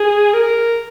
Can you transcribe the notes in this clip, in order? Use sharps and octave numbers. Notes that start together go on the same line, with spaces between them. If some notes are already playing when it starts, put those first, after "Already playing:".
Already playing: G#4
A#4